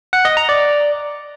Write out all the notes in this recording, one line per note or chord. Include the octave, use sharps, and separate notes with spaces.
F#5
D#5
A#5
D5